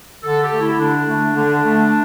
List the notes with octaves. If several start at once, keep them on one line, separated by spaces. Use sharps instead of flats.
D3 A4
G4
A3
E4
D3 D4
A3
D3
A3